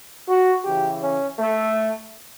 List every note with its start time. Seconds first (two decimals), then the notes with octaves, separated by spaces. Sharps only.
0.28 F#4
0.65 C#3 E3 G4
1.02 C#4
1.38 A3